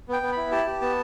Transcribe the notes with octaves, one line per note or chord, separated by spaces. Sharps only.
B3 G5
B3
E4 B5
G4 A5
G4
B3 A5